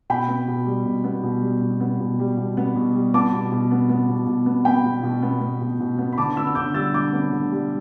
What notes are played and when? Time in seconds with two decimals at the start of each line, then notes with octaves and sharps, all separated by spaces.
0.10 B2 G5 B5
0.28 B3
0.48 B2
0.66 G3
0.86 B2
1.04 B3
1.23 B2
1.42 G3
1.61 B2
1.80 B3
2.00 B2
2.19 G3
2.37 B2
2.57 B3
2.76 B2
2.95 G3
3.14 B3 A5 D6
3.32 B2
3.52 B2
3.71 B3
3.89 B3
4.09 B2
4.27 B2
4.46 B3
4.65 B3 G5 B5
4.85 B2
5.03 B2
5.23 B3
5.41 B3
5.61 B2
5.80 B2
5.98 B3
6.13 B5
6.18 D3 A5 D6
6.36 B3 B5 E6
6.47 E6
6.55 D3 D6 G6
6.74 G3 E6 A6
6.94 D3 D6 G6
7.12 B3
7.32 D3
7.51 G3